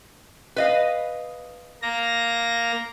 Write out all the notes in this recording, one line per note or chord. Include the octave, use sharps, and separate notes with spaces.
B4 D#5 F5
A#3 A#5 A#6